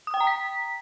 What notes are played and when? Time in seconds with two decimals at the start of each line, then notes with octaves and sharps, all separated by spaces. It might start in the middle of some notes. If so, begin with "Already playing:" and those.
0.07 D#6
0.14 G5
0.20 A#5
0.27 B6